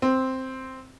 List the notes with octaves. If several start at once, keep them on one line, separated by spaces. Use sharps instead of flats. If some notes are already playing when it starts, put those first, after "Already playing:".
C4